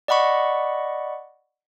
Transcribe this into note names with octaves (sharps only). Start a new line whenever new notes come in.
D5 D#5 F#5 B5 C#6